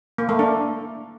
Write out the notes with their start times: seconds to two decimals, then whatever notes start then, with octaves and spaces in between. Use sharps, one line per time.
0.18 A#3
0.29 A3
0.39 D4